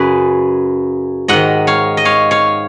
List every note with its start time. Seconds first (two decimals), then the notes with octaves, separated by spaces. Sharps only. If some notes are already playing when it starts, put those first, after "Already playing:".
Already playing: F#2 C#3 G#4 B4
1.28 G#2 D#3 D#5 F#5
1.67 C#5 F5
1.97 D#5
2.05 C#5 F5
2.31 C#5 F5